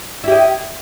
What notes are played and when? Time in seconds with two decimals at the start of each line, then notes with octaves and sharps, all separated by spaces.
0.24 E4
0.28 G4
0.32 D#5